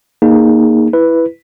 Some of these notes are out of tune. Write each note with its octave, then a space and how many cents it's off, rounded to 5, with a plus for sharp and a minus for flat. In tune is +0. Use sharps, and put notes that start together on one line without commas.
A#3 +0 D#4 -10 G#4 +0
E4 +5 B4 +0